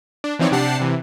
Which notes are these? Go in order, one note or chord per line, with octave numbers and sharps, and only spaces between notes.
D4
E3 F3 C4 D#4 C#5 D5
C3 D4 G4 F#5 A5 C7
C3 E3